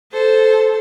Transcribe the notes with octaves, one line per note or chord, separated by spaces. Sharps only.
A4 C5